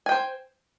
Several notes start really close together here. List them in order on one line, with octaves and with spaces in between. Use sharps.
G#5 G5 C5